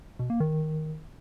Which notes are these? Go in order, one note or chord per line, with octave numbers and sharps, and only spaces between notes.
B2
A#3
D#3